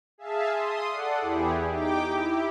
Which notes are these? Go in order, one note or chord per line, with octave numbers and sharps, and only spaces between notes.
G#4 E5 F5 A5
C6 D#6
A4 D5 F#5
E2 E4 G4 G#4
D#4 G4 G5 D6
E4 G4